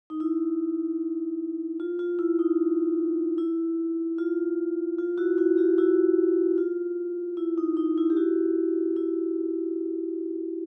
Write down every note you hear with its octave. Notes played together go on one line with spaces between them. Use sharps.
D#4
E4
F4
F4
E4
D#4
E4
F4
F4
E4 F#4
E4 F#4
F4 G4
E4 F#4
F4
E4
D#4
D#4
E4
G4
E4 F#4
E4